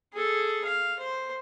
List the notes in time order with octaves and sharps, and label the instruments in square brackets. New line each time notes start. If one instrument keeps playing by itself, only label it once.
[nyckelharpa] G#4 A4
F5
C5